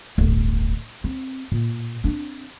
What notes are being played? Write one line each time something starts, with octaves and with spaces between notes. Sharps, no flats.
D1 G1
C4
A#2
C4 D4